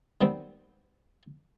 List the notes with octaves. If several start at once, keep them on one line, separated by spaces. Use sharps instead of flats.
D#3 G3 B3 C4